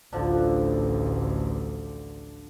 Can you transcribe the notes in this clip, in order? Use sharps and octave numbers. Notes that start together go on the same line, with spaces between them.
A1 D2 D3 F3 D4